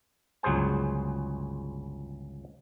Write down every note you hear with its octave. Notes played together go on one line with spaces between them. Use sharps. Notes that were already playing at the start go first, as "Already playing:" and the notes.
G1 C#2 F#3 G#4 C5 G#5